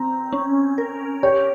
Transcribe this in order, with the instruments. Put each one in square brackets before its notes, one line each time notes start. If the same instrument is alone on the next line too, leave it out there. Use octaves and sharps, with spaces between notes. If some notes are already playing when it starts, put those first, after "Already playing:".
Already playing: [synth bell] C4 [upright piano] A#5
[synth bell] C#4
A#4
[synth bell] G4 [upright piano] C#5